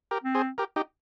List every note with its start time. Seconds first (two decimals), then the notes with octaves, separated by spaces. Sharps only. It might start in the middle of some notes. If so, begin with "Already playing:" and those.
0.11 G4 A#4
0.23 C4
0.35 G#4 C5
0.58 G4 A#4
0.76 D#4 G4